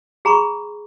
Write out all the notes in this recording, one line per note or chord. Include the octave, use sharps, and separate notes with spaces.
G#4 A#5 B5 C#6